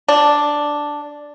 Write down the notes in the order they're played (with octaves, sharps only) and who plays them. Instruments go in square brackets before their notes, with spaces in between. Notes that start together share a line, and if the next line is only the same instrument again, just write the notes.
[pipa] D4